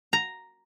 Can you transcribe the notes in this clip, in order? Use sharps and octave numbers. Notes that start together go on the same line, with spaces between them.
A#5